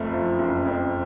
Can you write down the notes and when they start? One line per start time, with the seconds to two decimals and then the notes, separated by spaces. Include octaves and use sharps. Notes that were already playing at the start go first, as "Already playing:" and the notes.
Already playing: F#1 F2 A3
0.13 F3
0.39 F#1
0.65 F2